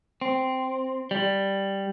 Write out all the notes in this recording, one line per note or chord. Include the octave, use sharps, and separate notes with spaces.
C4
G3